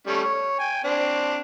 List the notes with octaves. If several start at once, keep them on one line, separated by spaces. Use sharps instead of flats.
G3 A3 C#4
C#5
G5 G#5
C4 D4